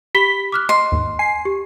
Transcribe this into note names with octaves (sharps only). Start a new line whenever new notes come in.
G4 B5 B6 G7
D6 F6 F#6
D#5 C6
D#2 G#2
G#5 C7
G4